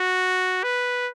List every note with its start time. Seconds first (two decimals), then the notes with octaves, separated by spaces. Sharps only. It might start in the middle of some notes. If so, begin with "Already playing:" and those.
Already playing: F#4
0.63 B4